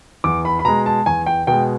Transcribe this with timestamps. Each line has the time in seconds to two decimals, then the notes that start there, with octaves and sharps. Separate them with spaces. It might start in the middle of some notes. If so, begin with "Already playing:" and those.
0.24 E2 D6
0.45 B5
0.59 B5
0.65 B2 G#3 A#5
0.86 A5
1.06 E2 G#5
1.26 G5
1.47 B2 G#3 G5